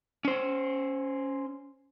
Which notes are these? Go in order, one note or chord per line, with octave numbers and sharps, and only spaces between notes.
C#4 C5